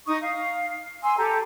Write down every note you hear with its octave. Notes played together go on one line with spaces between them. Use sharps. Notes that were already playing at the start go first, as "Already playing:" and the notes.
D#4 C#6 D#6
F5
G#5 C6 E6
G4 A4 A#5